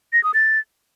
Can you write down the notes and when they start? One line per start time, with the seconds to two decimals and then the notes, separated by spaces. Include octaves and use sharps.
0.13 A#6
0.24 D#6
0.34 A6